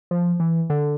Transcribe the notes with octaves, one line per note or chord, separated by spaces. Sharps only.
F3
E3
D3